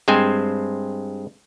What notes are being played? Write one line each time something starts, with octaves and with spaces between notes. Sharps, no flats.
G2 G#3 C4 C5 G#5